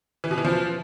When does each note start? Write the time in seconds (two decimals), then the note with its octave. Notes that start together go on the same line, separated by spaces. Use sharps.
0.24 E3
0.31 B2
0.38 E3
0.45 F3